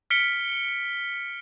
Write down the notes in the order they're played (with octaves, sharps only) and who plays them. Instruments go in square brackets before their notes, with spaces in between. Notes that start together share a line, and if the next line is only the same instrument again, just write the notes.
[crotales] F6 B6 C#7 D7 G7